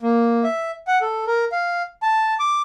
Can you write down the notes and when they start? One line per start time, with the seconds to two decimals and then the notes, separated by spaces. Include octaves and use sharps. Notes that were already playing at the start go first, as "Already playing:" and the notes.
0.02 A#3
0.44 E5
0.88 F#5
1.02 A4
1.27 A#4
1.52 F5
2.03 A5
2.40 D6